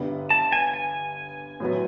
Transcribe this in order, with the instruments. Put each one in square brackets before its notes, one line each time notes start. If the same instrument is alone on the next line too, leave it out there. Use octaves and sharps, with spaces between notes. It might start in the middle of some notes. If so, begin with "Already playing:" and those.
Already playing: [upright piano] G1 G2 D3 G3 B3
[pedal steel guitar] A5
G#5
G#5
[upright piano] A2 F#3 B3